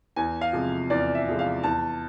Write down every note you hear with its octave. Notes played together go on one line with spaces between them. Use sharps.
E2 G#5
F5
C3 F3 G#3
E2 D5
E5
C3 F3 G#3
F5
E2 A5